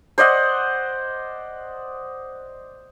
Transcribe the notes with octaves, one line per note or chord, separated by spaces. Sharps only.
C5 D5 D#5 F#5